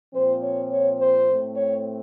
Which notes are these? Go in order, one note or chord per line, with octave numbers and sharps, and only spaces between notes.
A#2 F3 C4 C5
C#5
C#5
C5
A2 A3 C4
C#5